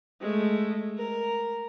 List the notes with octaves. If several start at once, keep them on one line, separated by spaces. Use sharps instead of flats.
G#3 A3
A#4